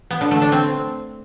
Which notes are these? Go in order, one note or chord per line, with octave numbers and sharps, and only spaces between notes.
B3
D3
A3
D4
C4